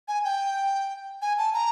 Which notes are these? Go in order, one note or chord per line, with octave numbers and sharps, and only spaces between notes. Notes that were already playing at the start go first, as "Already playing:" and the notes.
G#5
G5
G#5
A5
A#5